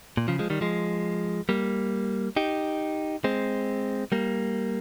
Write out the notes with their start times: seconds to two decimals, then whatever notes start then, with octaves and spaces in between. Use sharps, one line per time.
0.17 A#2
0.28 C#3 F3
0.39 F3 G#3
0.50 D#3 G3
0.61 F3 G#3
1.49 G3 A#3
2.36 D#4 G4
3.24 G#3 C4
4.12 G3 A#3